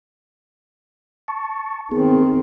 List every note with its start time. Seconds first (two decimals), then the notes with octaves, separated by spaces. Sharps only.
1.28 A5 C#6
1.92 D#3 B3 C4 G#4